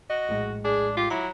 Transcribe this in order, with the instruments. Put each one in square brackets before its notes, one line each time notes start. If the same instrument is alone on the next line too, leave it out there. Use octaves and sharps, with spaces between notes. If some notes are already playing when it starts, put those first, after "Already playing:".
[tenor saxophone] F#4 [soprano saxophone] D#5
[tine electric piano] A#1 A2 G#3
[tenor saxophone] D4 [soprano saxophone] G#4
[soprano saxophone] F4 [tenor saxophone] G4
[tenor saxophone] F#3 [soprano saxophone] E4 [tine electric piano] A#5